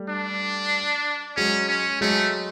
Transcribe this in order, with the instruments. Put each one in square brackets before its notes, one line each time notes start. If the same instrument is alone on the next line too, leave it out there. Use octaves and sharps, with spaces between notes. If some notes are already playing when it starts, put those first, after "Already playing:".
Already playing: [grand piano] G3 A3
[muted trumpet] D4
[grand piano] F#3 G#3 [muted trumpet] C#4
[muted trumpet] C#4
[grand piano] F#3 G#3 [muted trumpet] A3